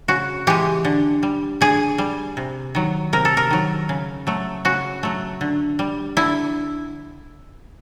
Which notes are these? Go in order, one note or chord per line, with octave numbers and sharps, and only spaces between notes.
C#3 F#4
E3 G#3 G4
D3
G3
D3 G#4
G3
C3
D#3 F#3
C3 A#4
A4
A#4
D#3 F#3
C#3
F#3 A3
C#3 F#4
F#3 A3
D3
G3
D3 E4